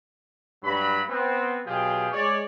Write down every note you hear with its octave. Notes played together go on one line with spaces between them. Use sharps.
G2 F#3 B5
B3 C4
B2 F#3 F4 G4 G#4 G5
G#3 C#5 D5